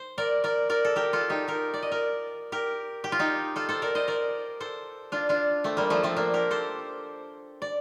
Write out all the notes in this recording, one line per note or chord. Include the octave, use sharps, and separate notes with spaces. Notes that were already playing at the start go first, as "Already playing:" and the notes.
Already playing: C5
A#4 D5
A#4 D5
A#4 D5
A4
G4 A#4
F4 A4
D#4 G4
G4 A#4
D5
D#5
A#4 D5
G4 A#4
G4
F4
D#4 G4
F4 A4
A4 C5
A#4 D5
C5 D#5
A#4 D5
A4 C5
D4 F4
D4 F4
A3 C4
G3 A#3
F3 A3
A3 C4
A#3 D4
G4 A#4
A4 C5
D5